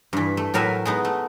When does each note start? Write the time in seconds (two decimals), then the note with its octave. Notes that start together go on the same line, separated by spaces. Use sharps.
0.13 G2 E3
0.37 A3
0.54 A2 F#3 A#4 B4 E5 G#5
0.85 G#3 B3 D#4
1.05 A3